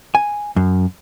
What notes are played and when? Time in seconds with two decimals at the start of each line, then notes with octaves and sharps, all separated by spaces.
0.15 G#5
0.56 F#2